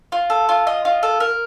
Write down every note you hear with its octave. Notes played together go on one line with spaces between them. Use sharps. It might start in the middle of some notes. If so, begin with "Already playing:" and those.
F4
A4
F4
D#5
F4
A4
A#4